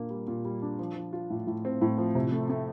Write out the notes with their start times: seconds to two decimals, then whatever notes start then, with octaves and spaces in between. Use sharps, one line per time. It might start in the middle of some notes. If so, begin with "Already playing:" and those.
Already playing: A#2 A#3 D4
0.10 G3
0.28 A#2
0.45 G3
0.62 D4
0.79 F3
0.96 F3
1.13 F4
1.30 A2
1.47 A2
1.65 C4
1.82 A2
1.98 F3
2.15 C3
2.32 A3
2.50 A3